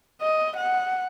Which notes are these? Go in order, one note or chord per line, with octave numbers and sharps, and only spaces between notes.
D#5
F#5